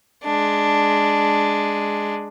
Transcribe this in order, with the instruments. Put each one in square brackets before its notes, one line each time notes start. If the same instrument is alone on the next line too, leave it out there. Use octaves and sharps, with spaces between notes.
[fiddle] G#3 D4